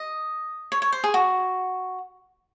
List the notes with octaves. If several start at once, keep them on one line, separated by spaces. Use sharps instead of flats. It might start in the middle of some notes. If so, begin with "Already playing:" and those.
Already playing: D#5
C#5
C#5
C5
G#4
F#4